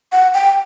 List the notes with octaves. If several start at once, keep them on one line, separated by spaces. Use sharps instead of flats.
F#5
G5